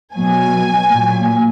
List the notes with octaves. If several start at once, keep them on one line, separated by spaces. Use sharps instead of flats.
B2 F#3 G#5
A#2 F#3